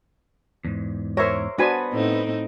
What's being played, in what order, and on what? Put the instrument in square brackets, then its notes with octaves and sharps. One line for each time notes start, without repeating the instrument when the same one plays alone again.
[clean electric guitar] E2 G#2
[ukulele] A#4 C5 [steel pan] C#5 E5
[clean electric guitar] B3 [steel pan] D4 G#5 [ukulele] F#4 B4 C5
[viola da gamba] A2 C4 D#4